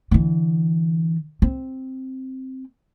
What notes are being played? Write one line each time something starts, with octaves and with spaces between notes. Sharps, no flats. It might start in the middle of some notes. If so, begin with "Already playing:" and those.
D3 E3
C4